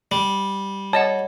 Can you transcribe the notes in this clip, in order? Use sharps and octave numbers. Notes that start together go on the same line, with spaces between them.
G3
C#5 D#5 F#5 A5